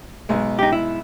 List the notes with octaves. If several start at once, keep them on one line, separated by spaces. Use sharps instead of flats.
B1 G#3
D#4 G4
E4